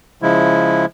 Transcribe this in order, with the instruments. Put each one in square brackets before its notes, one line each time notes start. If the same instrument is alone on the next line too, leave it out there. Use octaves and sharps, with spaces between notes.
[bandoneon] C#3 F3 G#3 E4